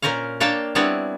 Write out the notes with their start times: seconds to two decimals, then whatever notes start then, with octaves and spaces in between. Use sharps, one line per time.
0.02 A#2 C#4 A#4 C5 C#5 F5
0.40 A#3 D4 C#5 F5 G5 A5
0.75 G3 B3 C4 D4 E4 C#5